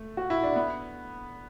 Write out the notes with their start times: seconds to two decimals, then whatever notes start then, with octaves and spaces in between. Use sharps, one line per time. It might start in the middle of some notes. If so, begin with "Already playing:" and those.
Already playing: A3
0.17 F#4
0.30 E4
0.43 D4
0.56 B3